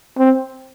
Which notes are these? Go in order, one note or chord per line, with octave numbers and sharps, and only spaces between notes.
C4